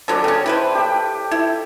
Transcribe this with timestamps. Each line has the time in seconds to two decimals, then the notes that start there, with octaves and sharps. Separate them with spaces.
0.08 D3 F#3 C#4 A4 D5
0.24 C#3 C#4 G5
0.46 E4 B4 C5
0.75 G4 G5
1.31 E4